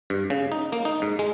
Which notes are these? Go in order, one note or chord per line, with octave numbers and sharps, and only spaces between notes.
G2
C#3
D#4
A#3
D#4
G#2
G#3